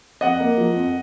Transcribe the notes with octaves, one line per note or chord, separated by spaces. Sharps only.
F2 D#5 F#5
A#3
F3
F2